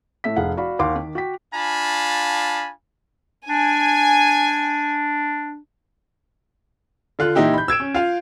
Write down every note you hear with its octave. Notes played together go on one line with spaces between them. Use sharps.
A2 A3 E5 B6
F1 G#4 F5 F#5
F#4 D5 F5 B5
D#2 F5 F#5 C6 D6
D#3
F#4 G5 B6
D4 F4 F5 G#5 A5 B5
D4 G#5
D3 F4 F#6
A#2 E3 D#4 E4 G4
B5 G6
E6 G#6 D7 E7
C#4
F4 F5